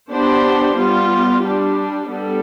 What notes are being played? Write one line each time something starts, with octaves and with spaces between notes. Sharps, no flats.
B3 D4 G4 C5
G3 B3 F4
G3 D4 G4
G3 B3 D4 A4